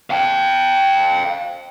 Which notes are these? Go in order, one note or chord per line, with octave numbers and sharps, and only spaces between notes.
F5 G5